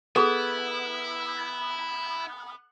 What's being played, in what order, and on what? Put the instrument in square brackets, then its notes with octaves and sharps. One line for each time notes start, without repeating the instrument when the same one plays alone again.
[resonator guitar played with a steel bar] B3 [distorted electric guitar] E4 [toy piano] G#4 A4